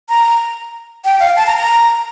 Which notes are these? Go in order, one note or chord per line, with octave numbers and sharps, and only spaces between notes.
A#5
G5
F5
A5
A#5
A#5